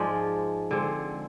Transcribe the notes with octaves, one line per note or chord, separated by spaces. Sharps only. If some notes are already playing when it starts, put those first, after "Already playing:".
Already playing: G#2 F3 G#3 D5
D3 G#3 C4